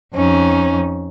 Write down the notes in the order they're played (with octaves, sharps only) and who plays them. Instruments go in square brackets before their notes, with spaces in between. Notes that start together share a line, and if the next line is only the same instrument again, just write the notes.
[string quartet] F2 C#4 D#4